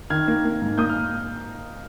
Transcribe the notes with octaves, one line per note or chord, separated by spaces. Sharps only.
D#3 F6 G#6
A#3
A#3
G#2
A#3 D#6 G6
F6